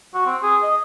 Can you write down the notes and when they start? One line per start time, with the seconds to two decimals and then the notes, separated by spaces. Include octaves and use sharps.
0.14 F#4
0.26 C4
0.43 G#4
0.62 D#5